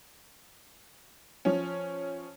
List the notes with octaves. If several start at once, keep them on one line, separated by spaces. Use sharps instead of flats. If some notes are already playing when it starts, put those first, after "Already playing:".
F3 C#4